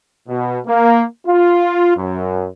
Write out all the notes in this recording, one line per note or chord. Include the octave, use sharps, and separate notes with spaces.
B2
A#3
F4
F#2